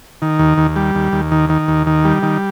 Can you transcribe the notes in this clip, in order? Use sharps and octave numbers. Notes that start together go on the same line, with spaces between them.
D#3
D#2
D#2
G3
D#2
D#2
D#3
D#3
D#2
D#3
G3
D#3